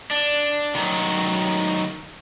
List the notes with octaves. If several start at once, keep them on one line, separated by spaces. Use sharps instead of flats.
D4
D#3 F#3